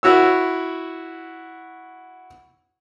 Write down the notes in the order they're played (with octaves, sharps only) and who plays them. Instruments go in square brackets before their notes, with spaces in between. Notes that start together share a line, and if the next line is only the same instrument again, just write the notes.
[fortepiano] E4 F#4 C#5 E6